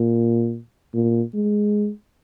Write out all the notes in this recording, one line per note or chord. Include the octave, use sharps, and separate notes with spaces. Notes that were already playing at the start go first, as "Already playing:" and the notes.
Already playing: A#2
A#2
G#3